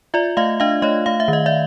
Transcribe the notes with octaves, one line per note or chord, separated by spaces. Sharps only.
F4 D5 E5
A3 D#5 F5
D4 D#5 F5
A3 C#5 D#5
A3 F5
E5
D#3 D#5
D5 E5